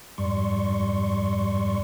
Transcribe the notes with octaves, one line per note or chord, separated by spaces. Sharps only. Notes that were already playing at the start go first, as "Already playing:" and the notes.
F2 G#2 G3 D5 C6 C#6